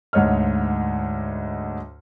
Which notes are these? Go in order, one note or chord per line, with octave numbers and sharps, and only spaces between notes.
D2 G#2 C#5 D#5 F6